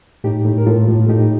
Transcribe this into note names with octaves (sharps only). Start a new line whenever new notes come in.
A2 D#4 G4
A2
A#4
A2 F4 A4
A2
A2 D#4 G4